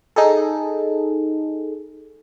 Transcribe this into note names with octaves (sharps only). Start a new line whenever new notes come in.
D#4 G#4 A4